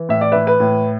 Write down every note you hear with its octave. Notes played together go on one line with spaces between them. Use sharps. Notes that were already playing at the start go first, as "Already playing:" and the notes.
Already playing: E3
A2 E5
D5
E3 B4 E5
B4
A2